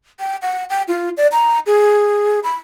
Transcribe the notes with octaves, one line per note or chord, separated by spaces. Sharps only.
G5
F#5
G5
F4
D5
A#5
G#4
B5